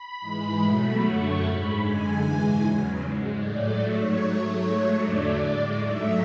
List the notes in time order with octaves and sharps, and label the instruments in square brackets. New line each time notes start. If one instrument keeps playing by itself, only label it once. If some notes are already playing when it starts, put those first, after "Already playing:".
Already playing: [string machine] B5
G#2 E3 G#3
B2 F#3 A3 B5
F#2 D3 F#3 A3 C#6
G#2 G#3 B5
F#2 D3 G#3 G#5
G#2 E3 G#3
E2 C#3 F#3
G#2 G#3
A2 F#3 A3 D5
G#2 F#3 A3 C#5
G#2 F#3 A3
G#2 F#3 A3 C#5
E2 D3 F#3 A3 D5
A2 G#3
G#2 F#3 A3 E5